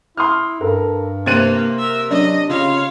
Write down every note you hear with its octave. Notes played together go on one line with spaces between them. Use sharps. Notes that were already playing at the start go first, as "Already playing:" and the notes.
E4 C6 D#6 F6
G2 A4 A#4
C3 A#3 C5 F#6 G#6 A6 D#7
A#4 E5
F#3 D4 D#5
C#3 F4 C#5 F5